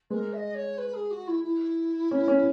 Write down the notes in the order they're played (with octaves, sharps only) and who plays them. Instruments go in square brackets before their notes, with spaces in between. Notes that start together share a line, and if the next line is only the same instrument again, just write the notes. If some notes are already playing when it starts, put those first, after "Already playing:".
[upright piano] G#3 [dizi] A#4 B4
[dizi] E5
D#5
C#5
B4
G#4
F#4
E4
E4
[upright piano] C#4
C#4